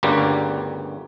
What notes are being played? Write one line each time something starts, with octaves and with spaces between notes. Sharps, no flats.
G1 D2 G2 C#3 G3 A#3